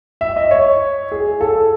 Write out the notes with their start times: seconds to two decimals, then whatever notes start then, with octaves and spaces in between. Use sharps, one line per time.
0.21 E5
0.36 D#5
0.51 C#5
1.12 G#4
1.41 A4